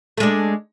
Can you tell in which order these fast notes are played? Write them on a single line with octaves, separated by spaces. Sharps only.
A3 G#3 D4